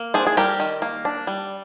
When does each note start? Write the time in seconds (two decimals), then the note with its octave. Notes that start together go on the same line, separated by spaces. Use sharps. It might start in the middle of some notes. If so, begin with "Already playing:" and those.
Already playing: A#3
0.14 D4 G#4 C5
0.27 G#4
0.37 G3 G4 A#4
0.60 D#3
0.82 A#3
1.05 D4
1.27 G3